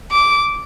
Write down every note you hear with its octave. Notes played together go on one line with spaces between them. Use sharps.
D6